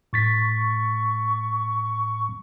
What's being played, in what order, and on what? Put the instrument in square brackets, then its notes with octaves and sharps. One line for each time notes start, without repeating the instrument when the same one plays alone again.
[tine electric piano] A2 A6 B6 [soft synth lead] C#6